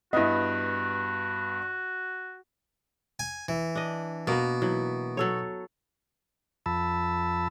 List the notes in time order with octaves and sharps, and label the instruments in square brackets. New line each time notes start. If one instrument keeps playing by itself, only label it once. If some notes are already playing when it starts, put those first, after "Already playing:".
[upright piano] G2 B3 [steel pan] E4 D#5 [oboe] F#4
[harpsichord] G#5
E3
[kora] D4 D#5
[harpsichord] B2 [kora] A#3 B3
[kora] E3 F#3
F#3 A4 C#5
[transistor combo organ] F2 A5 B5 E6